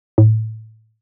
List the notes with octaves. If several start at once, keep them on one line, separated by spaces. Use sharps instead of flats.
A2